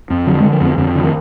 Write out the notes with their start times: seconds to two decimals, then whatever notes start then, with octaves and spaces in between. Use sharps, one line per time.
0.10 F2
0.27 D3 F#3
0.40 G#3
0.45 D3
0.52 F3
0.61 F2 B3
0.78 F2 D3
0.95 D3
1.04 D#3